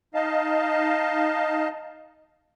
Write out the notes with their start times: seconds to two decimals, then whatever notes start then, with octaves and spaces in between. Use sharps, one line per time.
0.14 D#4 D#5 F5 A5